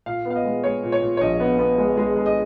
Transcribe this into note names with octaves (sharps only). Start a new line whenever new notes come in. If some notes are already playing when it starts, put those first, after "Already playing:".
A#2 F5
B3
F5
D#5
G#3
G#3 C#5
A#2
C#5
A#2
C#5
A#1 D#5
B3
B3
G#3
G#3
G#3
D#5